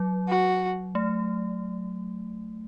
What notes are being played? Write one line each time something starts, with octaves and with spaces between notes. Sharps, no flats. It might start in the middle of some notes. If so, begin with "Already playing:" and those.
Already playing: F#3
F#4
A3